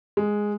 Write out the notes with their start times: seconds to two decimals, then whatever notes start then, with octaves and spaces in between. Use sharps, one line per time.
0.17 G#3